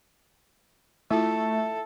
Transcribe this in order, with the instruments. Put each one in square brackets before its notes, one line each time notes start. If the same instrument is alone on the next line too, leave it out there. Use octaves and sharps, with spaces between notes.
[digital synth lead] A3 [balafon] E4 F4 [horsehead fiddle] A4 [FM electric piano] E5